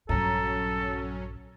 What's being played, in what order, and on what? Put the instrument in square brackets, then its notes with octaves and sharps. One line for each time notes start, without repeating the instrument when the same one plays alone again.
[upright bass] A#1 G2 [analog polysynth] F#3 C#4 [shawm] A4 [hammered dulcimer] A#5